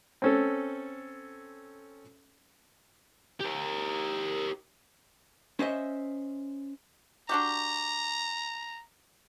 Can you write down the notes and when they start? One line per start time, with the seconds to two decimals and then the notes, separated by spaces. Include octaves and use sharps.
0.22 C4 C#4 A4
3.40 G4 A#4
5.59 C#4 C5 D#5 E5
7.29 D4 F#4 G4 A#5